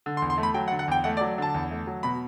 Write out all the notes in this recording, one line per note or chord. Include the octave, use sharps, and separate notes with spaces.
D3
C6
E2
C6
A3
B5
F#3 G5
F#5
D3
F#5
E2 G5
A3 F#5
D5
F#3
D3 A5
E2
A3
F#3
B2 B5